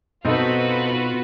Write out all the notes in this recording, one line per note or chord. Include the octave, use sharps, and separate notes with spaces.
B2 C4 D#4 F4 F#4 A4 B4